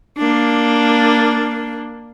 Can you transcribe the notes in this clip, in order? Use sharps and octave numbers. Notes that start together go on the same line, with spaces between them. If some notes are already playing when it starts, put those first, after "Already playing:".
A#3 D4